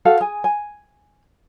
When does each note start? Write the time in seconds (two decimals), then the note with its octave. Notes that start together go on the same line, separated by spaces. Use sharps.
0.05 F#4 A4 F5
0.20 G#4 G#5
0.44 G#5